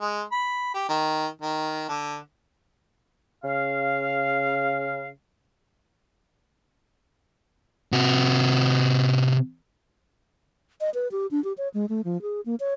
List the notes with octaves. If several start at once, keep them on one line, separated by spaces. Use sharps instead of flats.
G#3
B5
G4
D#3
D#3
D3
C#3 F5
C3 F#4
D#5
B4
G4
D4
G4
C#5
G#3
A3
F3
G#4
A#3
C#5